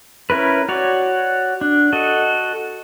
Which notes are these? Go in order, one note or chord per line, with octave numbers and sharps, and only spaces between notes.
C#4 E4 A#4 B4
F#4 C#5 D5
D4
F#4 A4 D#5